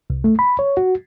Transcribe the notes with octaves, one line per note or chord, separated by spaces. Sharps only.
C2
A3
B5
C#5
F#4